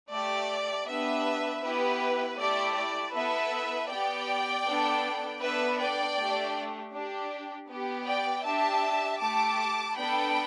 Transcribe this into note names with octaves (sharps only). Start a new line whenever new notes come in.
A3 G4 D5
B3 D4 G4 B4 E5
B3 E4 G4 B4
A3 E4 G4 D5
D5
B3 E4 A4 B4 E5
B3 G4 D5 G5
B3 D4 A4
B3 D4 A4 B4 E5
D5 G5
A3 D4 G4
D4 G4
B3 G4
D5 G5
D4 G4 E5 A5
A3 G4 A5 D6
B3 D4 A4 G5 B5